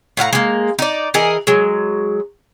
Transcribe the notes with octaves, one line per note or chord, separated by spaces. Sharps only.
A2 F5 F#5 A#5
G#3 A#3
D#4 D5
E3 G#4 A#4 D#5
F#3 G#3